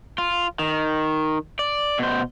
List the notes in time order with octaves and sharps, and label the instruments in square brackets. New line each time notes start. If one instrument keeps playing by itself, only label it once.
[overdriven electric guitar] F4
D#3
D5
B2 C5